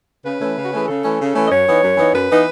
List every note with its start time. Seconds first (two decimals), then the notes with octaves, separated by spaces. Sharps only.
0.24 C#3 B4
0.40 E3 A3 C#4
0.56 C#3
0.64 F#4
0.72 E3 A3 C#4 G#4
0.87 C#3 A4
1.03 E3 A3 C#4
1.20 C#3
1.35 E3 A3 C#4
1.45 D#5
1.50 F#2 C#5
1.67 E3 B3 D#4
1.82 F#2
1.97 E3 B3 D#4
2.13 F#2 B4
2.29 E3 B3 D#4